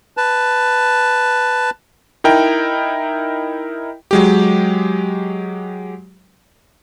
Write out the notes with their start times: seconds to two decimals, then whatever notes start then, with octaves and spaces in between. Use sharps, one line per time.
0.17 B4 A5
2.24 D#4 E4 A#4 G5
4.11 F#3 G#3 G4